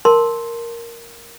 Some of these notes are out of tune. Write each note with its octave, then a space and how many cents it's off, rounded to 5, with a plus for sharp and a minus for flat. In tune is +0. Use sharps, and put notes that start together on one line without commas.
A#4 +0 A5 +0 C6 +0